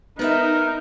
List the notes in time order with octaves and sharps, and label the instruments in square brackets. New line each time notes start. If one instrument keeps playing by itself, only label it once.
[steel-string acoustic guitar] B3 B4 E5 [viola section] D#4 [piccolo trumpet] A#4